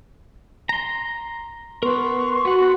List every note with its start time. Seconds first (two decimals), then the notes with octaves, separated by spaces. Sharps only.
0.69 A#5 C6
1.83 B3 A#4 B4 C6 C#6
2.45 B3 F#4 F#5